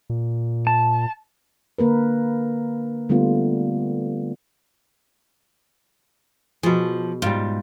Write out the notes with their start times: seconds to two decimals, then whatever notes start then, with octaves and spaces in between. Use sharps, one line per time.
0.10 A#2
0.67 A5
1.78 D3 A#3 A#4 B4
3.09 D3 G3 A3 B3 F4
6.63 B2 F3 G#4
7.22 G#2 G3 F4